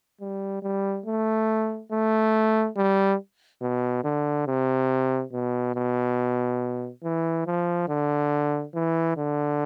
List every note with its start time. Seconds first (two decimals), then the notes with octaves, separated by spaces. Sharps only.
0.21 G3
0.63 G3
1.06 A3
1.92 A3
2.77 G3
3.62 B2
4.04 D3
4.47 C3
5.33 B2
5.75 B2
7.04 E3
7.46 F3
7.88 D3
8.75 E3
9.17 D3